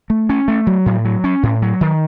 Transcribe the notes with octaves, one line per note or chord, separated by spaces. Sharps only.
A3
C#4
A3
F#3
A2
F#3
C#4
A2
F#3
D#3